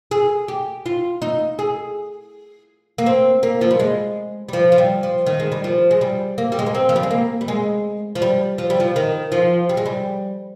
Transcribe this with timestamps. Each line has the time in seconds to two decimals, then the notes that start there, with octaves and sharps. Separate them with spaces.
0.11 G#4
0.48 G4
0.86 F4
1.22 D#4
1.59 G#4
2.98 A#3
3.06 C4
3.43 A#3
3.61 F3
3.71 G3
3.80 G#3
4.49 G3
4.53 F3
4.72 F3
4.78 G3
5.03 F3
5.26 D#3
5.40 G#3
5.52 G3
5.64 F3
5.91 G#3
6.01 G3
6.38 A#3
6.52 G3
6.59 G#3
6.67 A#3
6.75 C4
6.89 F3
6.96 G3
7.03 G#3
7.11 A#3
7.41 G3
7.48 G#3
8.15 F3
8.22 G3
8.58 F3
8.70 G3
8.80 F3
8.96 D#3
9.32 F3
9.69 G3
9.77 G#3
9.86 G3